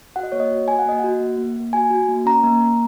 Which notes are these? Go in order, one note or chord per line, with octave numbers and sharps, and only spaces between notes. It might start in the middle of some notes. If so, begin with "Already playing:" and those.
F#4 F#5
D#5
A#3 C#5
D#5
F#4
F#4 G#5
F#5
A#3 D#5
F#4 F#5
A#3
A#3
A#3
F#4 G#5
F#4
A#3
C#4 A#5
A#3
A#3